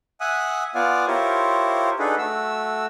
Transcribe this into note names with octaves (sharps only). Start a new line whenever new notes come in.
E5 F#5 G#5 D#6 F#6
B3 F4 D5 F5 F#5 G#5
E4 F4 G4 A#4 C5 C#5
D4 D#4 F#4 G#4 A4 B4
A3 F#4 E6